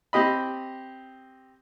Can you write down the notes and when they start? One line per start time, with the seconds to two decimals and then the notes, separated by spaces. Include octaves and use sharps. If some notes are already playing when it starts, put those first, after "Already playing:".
0.13 C4 G4 D#5 B5